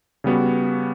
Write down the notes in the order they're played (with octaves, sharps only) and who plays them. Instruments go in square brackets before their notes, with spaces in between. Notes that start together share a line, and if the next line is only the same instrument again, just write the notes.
[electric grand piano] C#3 G3 B3 F#4